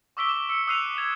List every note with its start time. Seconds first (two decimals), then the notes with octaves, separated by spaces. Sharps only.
0.17 C#6 D6 E6 B6 D7 G7
0.29 E7
0.49 E6 C#7
0.67 D#6 E6 F#6 C7 D#7 F7
0.95 G#6 E7 F7